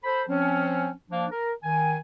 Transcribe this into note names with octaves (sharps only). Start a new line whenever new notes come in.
A4 C5 B5
F3 C4 C#4
F3 A#3 D4
A#4
D#3 G#5